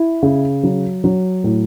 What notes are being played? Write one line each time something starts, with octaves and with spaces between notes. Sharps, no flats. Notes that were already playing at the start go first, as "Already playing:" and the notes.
Already playing: E4
C#3
F#3
F#3
A2